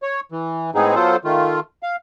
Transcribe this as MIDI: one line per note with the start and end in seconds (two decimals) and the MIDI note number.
0.02 0.20 73
0.32 0.71 52
0.75 0.95 45
0.75 0.95 56
0.75 0.95 59
0.75 0.95 60
0.75 0.95 63
0.75 0.95 68
0.95 1.16 54
0.95 1.16 59
0.95 1.16 65
0.95 1.16 69
0.95 1.16 72
1.25 1.60 51
1.25 1.60 57
1.25 1.60 65
1.83 1.96 77